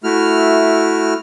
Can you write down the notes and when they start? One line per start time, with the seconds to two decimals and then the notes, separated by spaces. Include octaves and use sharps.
0.04 A3 E4 F#4 F6